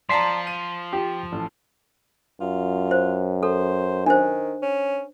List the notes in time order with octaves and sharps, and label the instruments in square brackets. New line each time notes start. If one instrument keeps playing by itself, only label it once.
[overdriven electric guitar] F3 [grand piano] D5 A5 A#5 [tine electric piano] C6 B6 C7
[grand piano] D#7
[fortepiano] F4 G4
A1
[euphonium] F#2 [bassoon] F4
[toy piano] C5
[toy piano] A4 [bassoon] C5
[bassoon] D#3 [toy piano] D4 C5
[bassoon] C#4